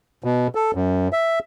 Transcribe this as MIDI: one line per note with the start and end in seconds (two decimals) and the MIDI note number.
0.24 0.47 47
0.55 0.71 69
0.75 1.08 42
1.13 1.39 76